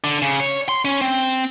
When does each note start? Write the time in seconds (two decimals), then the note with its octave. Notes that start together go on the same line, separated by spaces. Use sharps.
0.04 D3
0.22 C#3
0.40 C#5
0.69 C6
0.85 C#4
1.01 C4